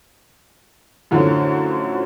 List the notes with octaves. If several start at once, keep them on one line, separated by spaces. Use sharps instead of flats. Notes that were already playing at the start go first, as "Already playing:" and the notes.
F#2 A2 D3 F3 F#3